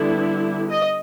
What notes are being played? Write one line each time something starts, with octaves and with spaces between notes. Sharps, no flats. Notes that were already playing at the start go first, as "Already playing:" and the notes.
Already playing: D3 G3 B3 E4
D#5